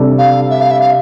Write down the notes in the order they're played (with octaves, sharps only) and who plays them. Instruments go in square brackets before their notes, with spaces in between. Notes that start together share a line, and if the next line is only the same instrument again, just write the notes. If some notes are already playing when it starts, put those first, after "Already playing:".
Already playing: [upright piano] C3 G3 D4 A4
[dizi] F5
E5
F5
E5
F5